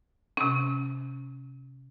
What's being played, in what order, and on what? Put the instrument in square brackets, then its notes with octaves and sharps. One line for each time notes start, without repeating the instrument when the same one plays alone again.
[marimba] C3 C#4